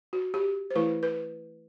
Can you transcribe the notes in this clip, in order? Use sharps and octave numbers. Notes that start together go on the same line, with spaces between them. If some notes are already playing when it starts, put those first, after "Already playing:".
F#4
G4
C5
E3 A3 E4 B4
B4